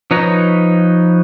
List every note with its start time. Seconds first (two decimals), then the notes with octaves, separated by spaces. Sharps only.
0.11 F3 D#4 B4 C#5 A#5